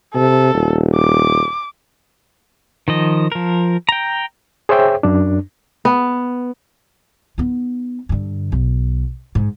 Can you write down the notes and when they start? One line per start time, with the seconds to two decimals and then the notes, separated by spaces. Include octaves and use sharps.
0.15 C3 A4
0.54 D#1
0.95 D6
2.88 D#3 F3 D#5
3.32 F3 A#4
3.89 G5 A#5
4.69 G#4 C5 C#5 E5 G5
5.03 F#2 D4
5.85 B3
7.38 B3 D#4
8.09 G2 D3
8.52 B1
9.35 G#2